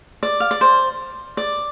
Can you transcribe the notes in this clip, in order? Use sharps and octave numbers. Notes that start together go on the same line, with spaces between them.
D5
F5
D5
C5
D5